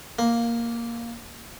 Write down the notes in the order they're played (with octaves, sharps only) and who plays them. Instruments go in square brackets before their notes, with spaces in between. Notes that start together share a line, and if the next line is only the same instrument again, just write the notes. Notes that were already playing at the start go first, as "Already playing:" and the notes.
[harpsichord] A#3